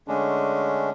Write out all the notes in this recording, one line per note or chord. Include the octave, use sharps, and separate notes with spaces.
D3 G#3 A3 C#4 D4